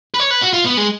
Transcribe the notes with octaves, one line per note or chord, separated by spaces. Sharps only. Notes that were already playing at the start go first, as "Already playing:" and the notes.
B4
C#5
B4
F#4
F4
B3
G#3